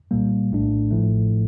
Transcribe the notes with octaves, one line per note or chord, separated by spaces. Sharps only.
C2 A#2 G3 A#3
A#1 A2 A3 D4
A1 A2 F3 A3